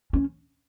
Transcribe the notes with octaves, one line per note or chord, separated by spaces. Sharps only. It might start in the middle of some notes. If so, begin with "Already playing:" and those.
C#4